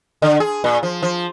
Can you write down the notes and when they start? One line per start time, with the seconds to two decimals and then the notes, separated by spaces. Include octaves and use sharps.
0.22 D3
0.40 G#4
0.64 A#2
0.83 F3
1.03 F3